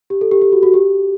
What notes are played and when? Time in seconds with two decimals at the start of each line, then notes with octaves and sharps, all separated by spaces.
0.10 G4
0.21 A4
0.31 G4
0.42 G4
0.52 F#4
0.63 F#4
0.74 G4